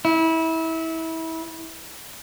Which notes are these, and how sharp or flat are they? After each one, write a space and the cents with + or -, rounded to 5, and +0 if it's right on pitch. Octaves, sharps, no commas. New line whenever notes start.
E4 -25